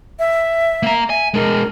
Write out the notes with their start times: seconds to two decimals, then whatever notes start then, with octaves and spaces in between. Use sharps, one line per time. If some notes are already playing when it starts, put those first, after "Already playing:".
0.19 E5
0.83 A#3 A#5
1.10 E5 G#5
1.34 G#3 D4 A#4